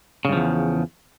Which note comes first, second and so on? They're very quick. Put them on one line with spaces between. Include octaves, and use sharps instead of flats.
C#3 G2 F3 E2